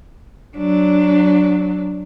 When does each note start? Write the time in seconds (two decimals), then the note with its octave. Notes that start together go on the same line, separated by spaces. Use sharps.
0.57 F#3 D4